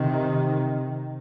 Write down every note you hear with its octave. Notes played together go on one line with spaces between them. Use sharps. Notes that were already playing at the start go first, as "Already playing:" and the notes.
Already playing: C3 D#3